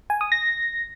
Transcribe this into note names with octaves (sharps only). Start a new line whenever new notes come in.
G#5
D#6
A#6